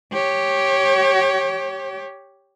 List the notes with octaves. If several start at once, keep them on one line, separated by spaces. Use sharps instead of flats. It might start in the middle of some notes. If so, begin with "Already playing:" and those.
G4 C#5